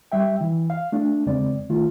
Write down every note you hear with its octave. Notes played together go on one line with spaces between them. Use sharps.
G3 E5 G5
E3
F5
A3 D4
E2 C#3 G#3 C4 D5
D#3 A3 F4